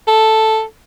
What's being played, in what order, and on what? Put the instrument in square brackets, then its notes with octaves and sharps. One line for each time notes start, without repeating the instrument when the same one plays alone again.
[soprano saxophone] A4